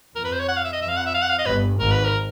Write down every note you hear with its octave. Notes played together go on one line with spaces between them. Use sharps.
F2 A#4
B4
C5
C#5
F#5
F5
E5
D#5
F2 E5
F5
F#5
E5
F5
F#5
F5
D#5
G1 G2 B4
G#1 G#2 A#4
B4
A#4